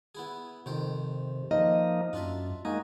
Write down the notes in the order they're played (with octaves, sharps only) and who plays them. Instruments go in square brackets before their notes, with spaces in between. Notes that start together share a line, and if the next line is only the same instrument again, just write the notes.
[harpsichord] B3 E4 G#4
[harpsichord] F2 D#3 C5 [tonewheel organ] C3
[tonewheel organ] F3 A#3 D#4 [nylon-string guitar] D#5
[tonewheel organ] F#2 [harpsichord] D4 F4 E5
[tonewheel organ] G#3 A#3 D#4 [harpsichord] F#4